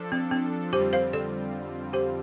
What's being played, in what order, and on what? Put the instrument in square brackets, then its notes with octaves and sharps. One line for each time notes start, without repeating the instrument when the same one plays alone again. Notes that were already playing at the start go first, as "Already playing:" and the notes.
Already playing: [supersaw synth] F3 D4 A4
[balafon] C4
C4
[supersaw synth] F2 D3 G3 C4 F4 [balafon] G4 C5
[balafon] C5 F5
A4 D5
G4 C5